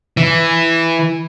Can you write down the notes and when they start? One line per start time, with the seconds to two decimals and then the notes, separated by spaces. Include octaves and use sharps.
0.17 E3